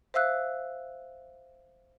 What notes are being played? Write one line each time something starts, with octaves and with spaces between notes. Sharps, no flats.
C5 E5 F5 E6 F#6